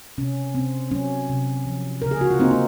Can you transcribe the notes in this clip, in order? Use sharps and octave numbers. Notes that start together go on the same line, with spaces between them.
C3 C#4
C3 C4
F#3 C#4
C3
F3
C#3 A#4
G#4
F#4
F4
A#3 C4 D#4
D#4